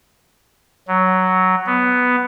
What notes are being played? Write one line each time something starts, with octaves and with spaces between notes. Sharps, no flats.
F#3
B3